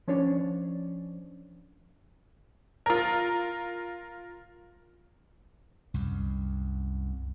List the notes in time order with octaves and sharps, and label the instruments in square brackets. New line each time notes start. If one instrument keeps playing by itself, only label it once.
[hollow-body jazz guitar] F3 C#4 D4 C#5 D5
[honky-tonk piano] F4 A#4
[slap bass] C2 F#2